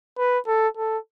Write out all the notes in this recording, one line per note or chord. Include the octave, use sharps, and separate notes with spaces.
B4
A4
A4